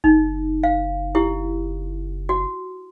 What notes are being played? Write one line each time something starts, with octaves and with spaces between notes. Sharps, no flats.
F#1 D#4
F5
E4 G4
F#4